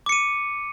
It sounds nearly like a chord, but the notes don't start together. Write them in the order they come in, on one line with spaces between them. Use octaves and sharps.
D6 C#7 D#7